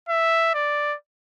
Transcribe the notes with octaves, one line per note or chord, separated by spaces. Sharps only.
E5
D5